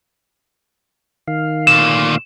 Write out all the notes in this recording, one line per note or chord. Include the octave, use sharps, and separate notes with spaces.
D#3 F5
D2 A#2 E7